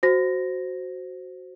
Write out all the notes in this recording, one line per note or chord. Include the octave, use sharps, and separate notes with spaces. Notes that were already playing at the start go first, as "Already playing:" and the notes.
F#4 C5 A#6